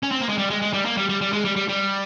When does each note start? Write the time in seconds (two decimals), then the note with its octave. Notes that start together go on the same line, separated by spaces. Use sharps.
0.03 C#4
0.11 C4
0.21 A#3
0.29 G#3
0.38 G3
0.50 G#3
0.62 G#3
0.73 G3
0.86 A#3
0.97 G3
1.09 G3
1.21 G3
1.33 G#3
1.45 G3
1.56 G3
1.69 G3